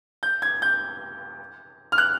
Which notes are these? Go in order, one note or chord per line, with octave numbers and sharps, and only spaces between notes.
G6
G#6
G6
F6
F#6